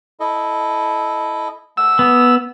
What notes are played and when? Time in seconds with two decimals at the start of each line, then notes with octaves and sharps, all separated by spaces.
0.20 E4 A4 D#5
1.77 A3 F#5 E6
1.99 B3